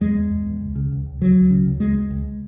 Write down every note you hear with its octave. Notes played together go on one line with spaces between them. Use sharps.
E2 G#3
E2
E2
E2
C#2
C#3
C#2
C#2
C#2 F#3
C#2
C#3
C#2
C#2 G#3
C#2
C#2